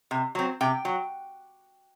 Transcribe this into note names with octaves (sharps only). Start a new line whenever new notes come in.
C3
F#3 C4
C3 G5
F#3